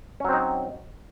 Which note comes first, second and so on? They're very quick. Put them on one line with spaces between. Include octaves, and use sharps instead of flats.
C#4 F#3 C4 D#4